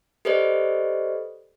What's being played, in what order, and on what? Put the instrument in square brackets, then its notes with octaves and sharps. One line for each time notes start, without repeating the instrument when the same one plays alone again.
[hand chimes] G4 A4 B4 C5 D5 D#5